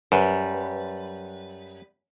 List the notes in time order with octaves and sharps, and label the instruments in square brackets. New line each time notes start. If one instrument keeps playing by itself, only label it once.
[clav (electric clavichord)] F#2 [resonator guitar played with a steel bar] G3 B4